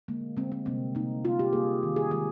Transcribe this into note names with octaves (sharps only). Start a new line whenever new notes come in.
D3 G#3 A#3
D3 G#3 C4
C4
C3 G3 A#3 C4
C3 G3 A#3 D#4
C3 G3 A#3 F4
G4
C3 G3 A#3 G#4
D#3 G#3
G#4
D#3 G#3 G#4